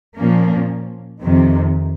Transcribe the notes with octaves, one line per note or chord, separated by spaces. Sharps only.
A#2 F3 A#3 C#4
F2 C3 D#3